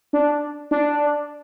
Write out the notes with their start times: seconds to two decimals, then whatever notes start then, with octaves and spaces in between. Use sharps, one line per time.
0.13 D4
0.71 D4